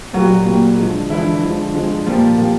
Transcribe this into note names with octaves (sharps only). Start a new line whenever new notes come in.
A#2 F#3 G3 A#3 F#4
A#2 G3 A#3
D3 F3 G#3
D3 E3 F3 G#3 E4
D3 F3 G#3
D3 F3 G#3
A#2 F3 G3 A#3 F4
A#2 G3 A#3